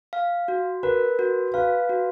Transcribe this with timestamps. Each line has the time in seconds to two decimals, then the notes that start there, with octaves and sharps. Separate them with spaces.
0.13 F5
0.48 F#4
0.83 A#4 B4
1.19 F#4
1.54 B4 F5
1.89 F#4